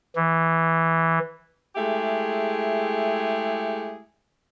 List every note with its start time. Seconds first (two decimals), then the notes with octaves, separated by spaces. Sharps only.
0.16 E3
1.76 G#3 A3 E4 G4 G#4 E5